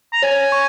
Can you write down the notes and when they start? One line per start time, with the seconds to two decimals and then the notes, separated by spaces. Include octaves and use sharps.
0.12 A#5
0.22 C#5 G#5
0.52 C#6